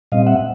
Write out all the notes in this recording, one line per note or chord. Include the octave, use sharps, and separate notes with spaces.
A#2 G3 C4 D#5 F5
E5 F#5